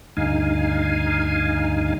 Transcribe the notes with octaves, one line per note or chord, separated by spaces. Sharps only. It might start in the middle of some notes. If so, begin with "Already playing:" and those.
D2 G2 D#4 F5 G#5